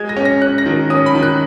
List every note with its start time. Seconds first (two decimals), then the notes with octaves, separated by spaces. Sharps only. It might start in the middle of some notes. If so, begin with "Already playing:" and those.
Already playing: G#3 G#6
0.09 A#6
0.17 C#4
0.25 A#6
0.42 C#4 F#6
0.58 A#6
0.66 D#3
0.90 C#4 D#6
1.06 B5
1.15 D#3
1.23 F#6